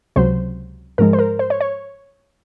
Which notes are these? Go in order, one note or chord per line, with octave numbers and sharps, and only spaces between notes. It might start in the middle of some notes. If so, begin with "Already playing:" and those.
C#2 C3 F#3 C5
G#2 F3 G#3 A#4
C5
A#4
C5
C#5
C#5